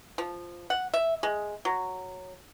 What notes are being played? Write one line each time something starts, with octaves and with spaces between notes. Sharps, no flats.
F3
F#5
E5
G#3
F#3